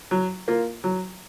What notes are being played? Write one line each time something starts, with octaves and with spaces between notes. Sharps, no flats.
F#3
A#3 F4
F#3